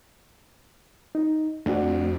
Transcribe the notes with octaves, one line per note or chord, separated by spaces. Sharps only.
D#4
F2 A3 D4 F#4